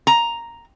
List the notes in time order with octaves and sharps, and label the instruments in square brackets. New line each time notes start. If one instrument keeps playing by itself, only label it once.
[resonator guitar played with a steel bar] A#5